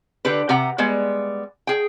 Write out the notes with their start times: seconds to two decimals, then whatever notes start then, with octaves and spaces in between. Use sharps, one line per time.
0.25 D3 G4 B4
0.49 C3 G4 F#5 A#5
0.78 G3 G#3 B3
1.67 G#4 G5